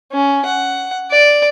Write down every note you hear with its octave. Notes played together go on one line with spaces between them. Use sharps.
C#4
F#5
D5